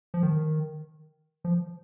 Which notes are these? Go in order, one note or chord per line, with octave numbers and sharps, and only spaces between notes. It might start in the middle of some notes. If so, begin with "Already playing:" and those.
F3
D#3
F3